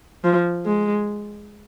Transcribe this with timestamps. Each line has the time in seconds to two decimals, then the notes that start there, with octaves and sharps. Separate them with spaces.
0.24 F3
0.66 G#3